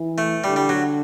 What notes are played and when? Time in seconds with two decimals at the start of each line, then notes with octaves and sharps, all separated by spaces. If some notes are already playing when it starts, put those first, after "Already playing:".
Already playing: E3
0.18 A3
0.44 D3 G3
0.56 G3
0.69 F#3